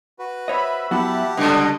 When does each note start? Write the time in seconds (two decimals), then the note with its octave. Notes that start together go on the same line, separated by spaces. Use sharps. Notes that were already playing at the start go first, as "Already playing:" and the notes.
0.19 F#4 B4
0.48 C5 C#5 D#5 E5 B5
0.91 F#3 B3 E4 G4 F#5 A5
1.37 C#2 B2 D3 G3 D4 D#6